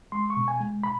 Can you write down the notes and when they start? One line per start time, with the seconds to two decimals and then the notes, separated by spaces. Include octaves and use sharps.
0.12 G#3 C6
0.30 C#6
0.37 B2
0.48 G#5
0.60 G#3
0.83 B2 B5